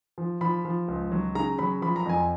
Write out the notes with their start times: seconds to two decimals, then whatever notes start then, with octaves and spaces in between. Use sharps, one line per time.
0.18 F3
0.41 F3 B5
0.65 F3
0.88 C#2
1.12 F#3
1.35 C#3 A#5
1.59 F#3 B5
1.82 F3 B5
1.96 A#5
2.06 F2 G#5